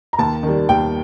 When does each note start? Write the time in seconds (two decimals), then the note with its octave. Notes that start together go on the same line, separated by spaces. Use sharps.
0.13 A#5
0.18 D#2 A5
0.43 D#3
0.48 G3
0.69 D#2 G5